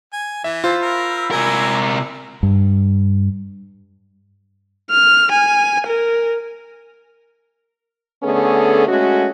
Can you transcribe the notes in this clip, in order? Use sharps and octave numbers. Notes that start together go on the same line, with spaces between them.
G#5
E3 E5
F4 C5 B5 E6
A#4
C3 F#3 A#4 G#5
G2
F6
G#5
A#4
D3 A3 B3 C#4 G#4 A4
G#3 A3 C#4 F#4